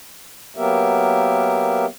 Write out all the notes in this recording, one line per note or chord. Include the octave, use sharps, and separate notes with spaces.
F#3 A#3 B3 G4 A#4 E5